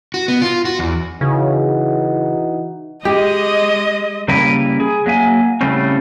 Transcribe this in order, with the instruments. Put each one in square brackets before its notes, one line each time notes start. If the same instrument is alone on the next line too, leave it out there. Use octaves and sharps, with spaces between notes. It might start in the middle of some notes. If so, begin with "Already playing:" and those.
[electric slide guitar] F#4
B3
F4
F#4
E2
[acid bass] C#3 [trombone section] E3 D#4 F#4
[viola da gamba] G#3 [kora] G4 [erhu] D#5
[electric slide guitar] C#3 G3 A#3 E4 A#4 B4
G#4
F#3 A#3 E5 G#5
A2 C#3 G3 A3 C4 C#4